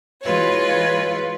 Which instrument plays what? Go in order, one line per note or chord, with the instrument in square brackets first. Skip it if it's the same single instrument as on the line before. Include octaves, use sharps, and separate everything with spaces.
[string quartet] E3 G#3 F4 F#4 B4 C#5